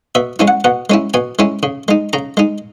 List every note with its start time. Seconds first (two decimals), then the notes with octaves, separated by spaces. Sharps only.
0.15 B2 E5
0.39 G#3 C#4 E4
0.48 F#5
0.64 B2 F#5
0.90 G#3 C#4 E4
1.14 B2 G#5
1.39 G#3 C#4 E4
1.63 C#3
1.88 G#3 D#4
2.13 C#3 A#5
2.37 G#3 D#4